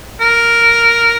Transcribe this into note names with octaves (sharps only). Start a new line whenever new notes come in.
A#4